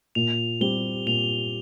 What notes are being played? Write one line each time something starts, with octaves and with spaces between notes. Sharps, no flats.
A#2 F7
G3 C4 G4 G7
A#2 F7